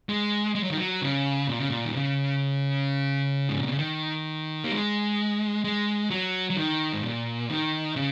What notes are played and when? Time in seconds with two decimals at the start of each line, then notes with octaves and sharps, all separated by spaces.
0.09 G#3
0.55 G#3
0.63 F#3
0.70 D#3
0.77 F#3
1.02 C#3
1.48 A#2
1.59 C#3
1.69 A#2
1.85 D#3
1.94 C#3
3.49 G#2
3.59 A#2
3.69 C#3
3.79 D#3
4.64 A#3
4.72 G#3
5.64 G#3
6.10 F#3
6.50 F#3
6.57 D#3
6.93 G#2
7.03 A#2
7.49 D#3
7.96 C#3